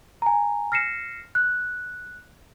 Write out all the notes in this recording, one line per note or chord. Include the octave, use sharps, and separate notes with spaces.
G#5 A#5
F6 A#6 C7 C#7 E7
F#6